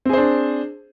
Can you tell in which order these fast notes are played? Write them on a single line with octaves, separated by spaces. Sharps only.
C4 G#4 C5 D4